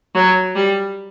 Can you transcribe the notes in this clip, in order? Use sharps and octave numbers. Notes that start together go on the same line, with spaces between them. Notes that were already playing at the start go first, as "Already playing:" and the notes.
F#3
G3